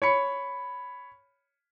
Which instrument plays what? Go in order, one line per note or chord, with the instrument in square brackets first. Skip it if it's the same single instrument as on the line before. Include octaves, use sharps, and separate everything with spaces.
[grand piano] C#5 B5 C#7